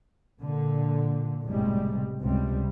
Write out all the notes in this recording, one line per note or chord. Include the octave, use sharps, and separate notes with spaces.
A#2 D3
F#1 B1 A2 C3 G3 G#3
C#2 G2 C3 G3